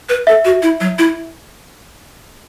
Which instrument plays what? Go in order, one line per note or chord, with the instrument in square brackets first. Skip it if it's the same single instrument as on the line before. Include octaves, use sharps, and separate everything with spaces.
[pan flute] B4
[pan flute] A4 [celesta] E5
[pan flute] F#4
E4
F#3
E4